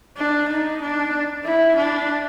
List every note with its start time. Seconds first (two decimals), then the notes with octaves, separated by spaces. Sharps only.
0.17 D4
0.49 D#4
0.82 D4
1.44 E4
1.76 D4